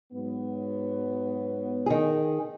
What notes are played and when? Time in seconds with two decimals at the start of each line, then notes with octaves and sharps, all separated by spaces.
0.12 G#2 F#3 B3
1.86 D#3 G#4